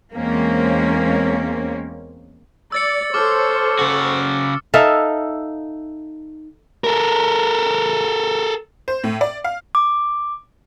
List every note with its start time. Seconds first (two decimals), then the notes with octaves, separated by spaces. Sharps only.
0.13 E2 G#3 A#3 C4 C#4
2.72 D5 E6 A6 C#7
3.14 A4 C5 C#5 D6 F6
3.79 C#3 F#4
4.74 D#4 A4 E5 F5
6.84 A4 A#4
8.88 C5
9.04 A2
9.21 D5
9.44 F5
9.75 D6